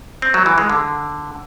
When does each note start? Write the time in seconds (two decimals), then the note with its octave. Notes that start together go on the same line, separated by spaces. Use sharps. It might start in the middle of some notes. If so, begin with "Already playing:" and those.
0.22 C4
0.34 F#3
0.46 E3
0.58 G#3
0.69 D3